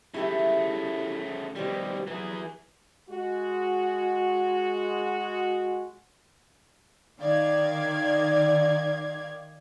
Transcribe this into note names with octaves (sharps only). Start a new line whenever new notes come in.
C#3 A3 E4 G4 E5
B2 D#3 G3 G4 C5
E3 F#3 G#4
G#3 F#4
D#3 D5 F5 G#6